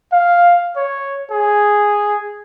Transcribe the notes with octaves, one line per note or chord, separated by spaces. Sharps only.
F5
C#5
G#4